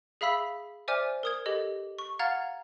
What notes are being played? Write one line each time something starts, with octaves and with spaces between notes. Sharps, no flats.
G#4 E5 F5 B5 E6 B6
C5 D5 E5 G#5 D6 F6
A#4 D#6 G#6
G4 A4 D#5
C#6
F5 F#5 A#5 F6 G#6 A6